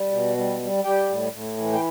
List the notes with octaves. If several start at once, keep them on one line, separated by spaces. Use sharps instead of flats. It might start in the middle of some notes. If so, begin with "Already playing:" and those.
Already playing: G3
B2
G3
G3
G3 G4 G5
A2
A2
E3
G5